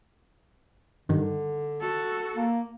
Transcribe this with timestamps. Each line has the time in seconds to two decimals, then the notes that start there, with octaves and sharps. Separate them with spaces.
1.09 G2 D3 D#3
1.80 F#4 A4
2.35 A#3